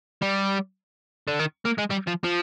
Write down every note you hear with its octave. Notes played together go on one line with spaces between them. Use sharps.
G3
D3
D#3
A#3
G#3
G3
F3
F3